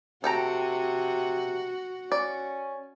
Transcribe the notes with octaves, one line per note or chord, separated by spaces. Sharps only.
C3 F#4 A4 G5 A#5
C#4 D5